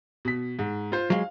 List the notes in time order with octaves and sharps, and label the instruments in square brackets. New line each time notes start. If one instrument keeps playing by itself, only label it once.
[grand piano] B2 B6
G#2
F4 C5
[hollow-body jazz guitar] F#3 G#3 [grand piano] F5